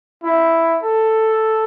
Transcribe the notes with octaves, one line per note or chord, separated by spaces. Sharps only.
E4
A4